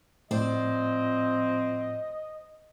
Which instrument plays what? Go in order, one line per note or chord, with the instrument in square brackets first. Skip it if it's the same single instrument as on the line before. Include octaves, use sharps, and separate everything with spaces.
[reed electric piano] A2 [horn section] F3 C4 [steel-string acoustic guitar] C5 D5 [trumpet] D#5